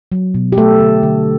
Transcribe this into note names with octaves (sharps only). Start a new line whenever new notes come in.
F#3
B2
G4
A3 A4
D3
D3